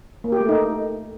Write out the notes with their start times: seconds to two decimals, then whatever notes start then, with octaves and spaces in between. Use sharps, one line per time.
0.24 A#3
0.32 G4
0.41 A3
0.49 D#4